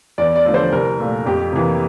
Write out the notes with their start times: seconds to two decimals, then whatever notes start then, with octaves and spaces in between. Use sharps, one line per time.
0.18 E2 D5
0.36 D5
0.45 D3 F3 A3
0.54 C5
0.72 C2 A#4
1.00 A#2 A3
1.26 F2 G4
1.53 C3 E3 A#3